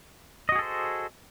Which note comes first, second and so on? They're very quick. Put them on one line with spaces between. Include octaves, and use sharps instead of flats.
D#5 F#4 G#4 A4 C5